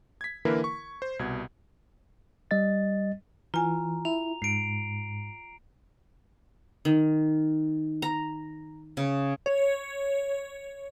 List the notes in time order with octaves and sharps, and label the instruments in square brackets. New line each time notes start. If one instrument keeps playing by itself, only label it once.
[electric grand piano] G#6 B6
D3 E3 A#3 E4 A#4 B4
C#6
C5
C2 B2 G#6
[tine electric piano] G3 D#5 A6
[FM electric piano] E3 [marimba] F4 G#5 [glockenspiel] A#5
[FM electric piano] E4 [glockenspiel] F7
[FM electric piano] G#2 [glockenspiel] C7 D7
[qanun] D#3
A#5
C#3
[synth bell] C#5